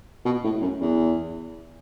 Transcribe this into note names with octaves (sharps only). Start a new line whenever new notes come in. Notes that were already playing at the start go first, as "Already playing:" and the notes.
B2
A2
F#2
E2